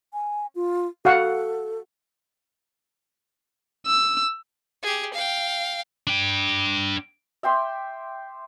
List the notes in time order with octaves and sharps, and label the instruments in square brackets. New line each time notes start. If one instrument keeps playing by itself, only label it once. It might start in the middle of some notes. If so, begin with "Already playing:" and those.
[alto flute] G#5
F4
[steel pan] F#4 F5 F#5 [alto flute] A4
[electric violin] E6
[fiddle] G4 G#4
F5 G5
[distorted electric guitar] D4 G5
[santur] E5 G5 C6 D6